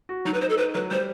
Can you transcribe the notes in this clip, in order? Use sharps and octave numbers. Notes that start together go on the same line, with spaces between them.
F#4
F#3 D#4
B4
D#4 C5
A4
D#4 B4
F#3 B4
G3 C5